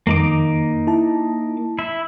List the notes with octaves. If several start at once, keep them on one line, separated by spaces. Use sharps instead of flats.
F2 D#3 A#3 D#4 D6
E4 A5
E4